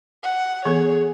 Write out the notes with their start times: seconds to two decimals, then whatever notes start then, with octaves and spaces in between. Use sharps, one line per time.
0.24 F#5
0.65 E3 B3 G#4 A4 C#5